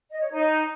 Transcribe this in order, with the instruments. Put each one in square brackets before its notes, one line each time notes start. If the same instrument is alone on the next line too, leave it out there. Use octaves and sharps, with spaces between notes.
[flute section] D#5
C#5
D#4